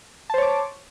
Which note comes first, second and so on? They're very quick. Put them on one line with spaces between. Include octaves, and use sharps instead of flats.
A5 C5 C#5 D6